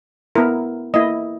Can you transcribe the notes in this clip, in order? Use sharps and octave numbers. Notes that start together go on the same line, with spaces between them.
B3 E4 A#4
A#3 E4 D#5